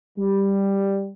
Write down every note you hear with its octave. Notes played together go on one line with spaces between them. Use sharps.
G3